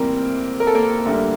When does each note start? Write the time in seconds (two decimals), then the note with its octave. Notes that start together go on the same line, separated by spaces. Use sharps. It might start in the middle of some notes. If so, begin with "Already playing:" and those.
Already playing: A2 E3 G3 A#3 C4 A#4
0.60 A#4
0.67 A4
0.75 A#3 A#4
1.05 D2 D3 G3